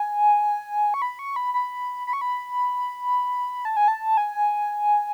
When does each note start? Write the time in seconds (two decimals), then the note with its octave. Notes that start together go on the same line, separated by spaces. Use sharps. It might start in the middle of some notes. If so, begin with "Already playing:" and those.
Already playing: G#5
0.94 C#6
1.02 B5
1.19 C#6
1.36 B5
1.54 B5
2.07 B5
2.13 C#6
2.21 B5
3.65 A5
3.77 G#5
3.88 A5
4.17 G#5